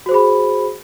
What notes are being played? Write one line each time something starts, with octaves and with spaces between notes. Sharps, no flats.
F#4 G#4 C5 B5